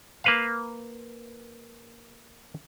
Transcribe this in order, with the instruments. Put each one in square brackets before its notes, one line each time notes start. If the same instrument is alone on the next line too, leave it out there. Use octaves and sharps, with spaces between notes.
[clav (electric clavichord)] A#3 B4 F5